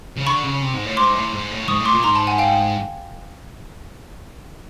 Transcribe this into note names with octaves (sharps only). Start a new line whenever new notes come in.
C#3
D3 B5 C#6
C#3
C3
G#2
A2
G#2 C6 D6
A2
G#2
A2
G#2 C#6 D#6
A2
C6 D6
A#2
G#2 A#5 C6
A5 B5
F#5 G#5
F5 G5